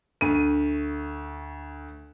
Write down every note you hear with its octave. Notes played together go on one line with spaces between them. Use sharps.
D2 D#7